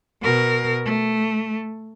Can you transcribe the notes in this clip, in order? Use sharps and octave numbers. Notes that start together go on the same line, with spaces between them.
B2 A#4
A3